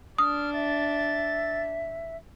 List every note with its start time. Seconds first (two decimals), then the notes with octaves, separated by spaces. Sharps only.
0.19 D4 D#6 F6
0.53 E5 A6